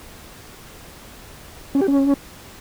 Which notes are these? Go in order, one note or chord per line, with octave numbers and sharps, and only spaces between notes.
C#4
G4
C#4